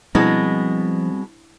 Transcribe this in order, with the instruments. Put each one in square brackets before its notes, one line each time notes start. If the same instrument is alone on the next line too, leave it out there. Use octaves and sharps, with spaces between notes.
[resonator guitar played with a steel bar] B2 G#3 B3 [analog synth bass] F3 [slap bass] G3 C4 [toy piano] D4 E4